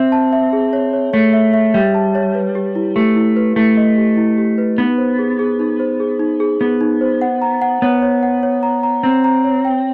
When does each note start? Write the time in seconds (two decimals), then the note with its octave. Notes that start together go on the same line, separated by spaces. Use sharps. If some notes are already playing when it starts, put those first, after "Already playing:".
Already playing: C4 E5
0.12 A5
0.33 E5
0.53 G#4
0.73 C#5
0.93 C#5
1.13 A3 C#5
1.33 E5
1.54 E5
1.74 G3 E5
1.95 A5
2.15 C#5
2.35 B4
2.55 G4
2.75 E4
2.96 A3 G4
3.16 E4
3.36 B4
3.56 A3 E4
3.77 D#5
3.97 G4
4.17 E4
4.38 G4
4.58 B4
4.78 B3 D#4
4.98 C5
5.19 G#4
5.39 G#4
5.59 D#4
5.80 C5
6.00 G#4
6.20 D#4
6.40 G#4
6.60 B3 G#4
6.81 D#4
7.01 C5
7.22 F#5
7.42 A#5
7.62 F#5
7.82 B3 C#5
8.02 C#5
8.23 F#5
8.43 C#5
8.63 A#5
8.83 A#5
9.03 C4 A#5
9.24 A#5
9.45 C#5
9.65 G5